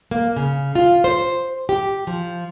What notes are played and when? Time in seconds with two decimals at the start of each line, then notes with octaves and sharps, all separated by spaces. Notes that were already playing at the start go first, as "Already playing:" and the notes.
0.11 A#3
0.36 C#3
0.75 F4
1.04 C5
1.69 G4
2.07 F3